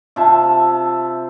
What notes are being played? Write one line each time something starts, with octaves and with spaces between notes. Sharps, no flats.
C3 F4 E5 A5